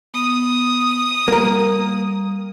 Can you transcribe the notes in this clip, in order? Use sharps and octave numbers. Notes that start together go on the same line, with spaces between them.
B3 D#6
G3 A#3 A#4